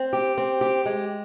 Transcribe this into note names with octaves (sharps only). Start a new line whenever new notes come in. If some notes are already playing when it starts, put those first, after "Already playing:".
Already playing: C4
G4
C4
G4
G#3